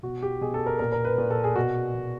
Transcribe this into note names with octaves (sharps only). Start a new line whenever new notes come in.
B2 F#4
G4
B2 G#4
A4
A#4
A#2 A#4
A#4
B4
A#2
A4
G#4
B2 F#4
B2